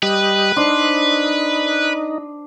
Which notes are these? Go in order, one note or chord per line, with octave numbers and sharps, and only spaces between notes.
G3 G4 B4 D#5
D4 D#4 C5